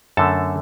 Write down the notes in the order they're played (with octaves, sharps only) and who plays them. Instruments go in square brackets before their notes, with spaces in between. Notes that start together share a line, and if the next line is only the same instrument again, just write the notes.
[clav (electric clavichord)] F#2 D3 A3 A4 A5